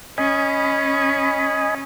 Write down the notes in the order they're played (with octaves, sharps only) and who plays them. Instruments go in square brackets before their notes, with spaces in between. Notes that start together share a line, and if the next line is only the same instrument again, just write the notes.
[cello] C#4 [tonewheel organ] D#5 G#5 B5